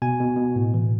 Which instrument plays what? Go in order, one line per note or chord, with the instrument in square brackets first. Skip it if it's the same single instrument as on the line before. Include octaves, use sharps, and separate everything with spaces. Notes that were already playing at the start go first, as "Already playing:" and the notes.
[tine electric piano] B2 G#5
B2
B2
A2
E3